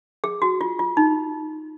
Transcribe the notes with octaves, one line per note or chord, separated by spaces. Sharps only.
G#4
F#4
F4
F4
D#4